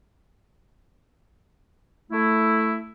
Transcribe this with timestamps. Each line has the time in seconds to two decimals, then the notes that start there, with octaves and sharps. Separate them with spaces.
2.12 A3 E4